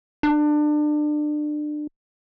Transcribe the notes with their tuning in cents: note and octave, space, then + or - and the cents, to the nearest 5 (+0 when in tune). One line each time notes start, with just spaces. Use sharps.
D4 +30